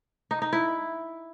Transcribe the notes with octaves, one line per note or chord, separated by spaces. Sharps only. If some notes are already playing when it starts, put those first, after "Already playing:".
D#4
D#4
E4